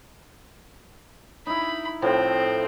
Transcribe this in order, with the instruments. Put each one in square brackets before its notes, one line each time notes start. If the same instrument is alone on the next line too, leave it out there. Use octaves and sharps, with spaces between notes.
[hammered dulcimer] D#4 E4 [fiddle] B5
[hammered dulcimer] A2 F3 A3 [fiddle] C4